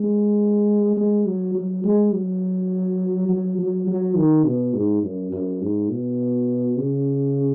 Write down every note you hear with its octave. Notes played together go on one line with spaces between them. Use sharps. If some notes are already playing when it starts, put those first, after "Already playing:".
Already playing: G#3
G#3
F#3
F#3
G#3
F#3
F#3
F#3
F#3
D#3
B2
G#2
F#2
F#2
G#2
B2
C#3